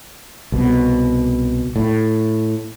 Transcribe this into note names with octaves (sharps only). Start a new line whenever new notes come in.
C2 B2
A2